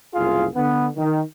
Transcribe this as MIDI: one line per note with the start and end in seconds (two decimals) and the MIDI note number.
0.14 0.45 30
0.14 0.45 36
0.14 0.45 65
0.14 0.45 68
0.14 0.45 77
0.55 0.86 50
0.55 0.86 59
0.96 1.20 51